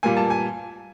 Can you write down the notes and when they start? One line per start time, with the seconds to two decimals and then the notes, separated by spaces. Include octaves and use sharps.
0.03 A#2 G3 A#3 G#5
0.17 A5
0.30 G#5